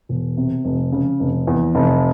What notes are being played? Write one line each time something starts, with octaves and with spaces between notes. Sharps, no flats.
E1
C3
F1
C#3
F1
E2
F1